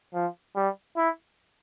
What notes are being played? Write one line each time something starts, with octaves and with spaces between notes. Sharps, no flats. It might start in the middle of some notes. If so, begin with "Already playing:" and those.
F3
G3
E4